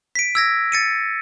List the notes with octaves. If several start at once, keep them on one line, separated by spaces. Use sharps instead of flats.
B6 D7
E6 G#6 A#6
A6 C#7 D#7